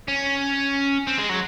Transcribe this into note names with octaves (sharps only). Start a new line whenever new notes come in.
C#4
C4
G#3
F#3